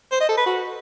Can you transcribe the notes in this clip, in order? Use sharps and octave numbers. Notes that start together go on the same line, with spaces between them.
C5
D#5
A4
B4
F#4